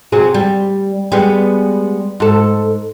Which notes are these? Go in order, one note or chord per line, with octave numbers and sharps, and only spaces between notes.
C3 F#3 G#4
G3
G3 G#3 B3
G#2 A4